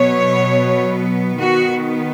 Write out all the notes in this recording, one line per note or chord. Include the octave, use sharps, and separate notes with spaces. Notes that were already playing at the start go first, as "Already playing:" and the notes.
Already playing: B2 F#3 B3 C#5
D#3 B3 F#4